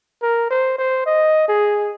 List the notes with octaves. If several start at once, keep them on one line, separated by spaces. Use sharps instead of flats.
A#4
C5
C5
D#5
G#4